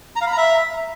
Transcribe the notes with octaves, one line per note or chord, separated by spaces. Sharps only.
A#5
F5
B5
A#5
E5